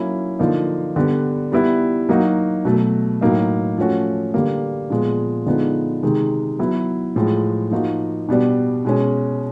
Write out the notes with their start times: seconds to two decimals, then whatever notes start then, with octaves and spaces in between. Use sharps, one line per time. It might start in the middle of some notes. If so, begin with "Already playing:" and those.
Already playing: F#3 A#3 C#4 E4
0.39 D3 F3 A#3 D#4
0.96 D3 G3 B3
1.52 G3 B3 E4
2.09 F#3 A#3 D#4 F#4
2.65 B2 F#3 A3
3.21 A2 F#3 A#3 D#4
3.78 F3 A3 C#4 F#4
4.34 D3 G3 A#3
4.90 A#2 F3 G#3 B3
5.46 D3 F3 G#3 B3 D#4
6.03 C3 D#3 G#3
6.59 F#3 B3 E4
7.16 A2 F3 G#3
7.71 F3 A#3 D#4 F#4
8.29 B2 G3 B3 D4
8.85 B2 G#3 C#4